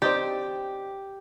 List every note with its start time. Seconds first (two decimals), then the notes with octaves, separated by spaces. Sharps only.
0.02 C4 D#4 G4 D5